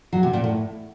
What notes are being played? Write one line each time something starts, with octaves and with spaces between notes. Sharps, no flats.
F#3
C3
A#2
A2